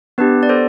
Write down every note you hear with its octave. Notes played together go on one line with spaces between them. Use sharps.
B3 D4 G4 B4
D5
A4 C5